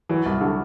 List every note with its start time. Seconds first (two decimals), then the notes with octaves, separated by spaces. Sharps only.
0.09 E3 F#3
0.26 C2
0.41 D3 F#3